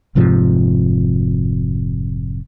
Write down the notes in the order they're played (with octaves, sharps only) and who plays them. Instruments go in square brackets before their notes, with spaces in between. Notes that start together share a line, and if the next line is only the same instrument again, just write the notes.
[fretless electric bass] F1 G#2 C3 F3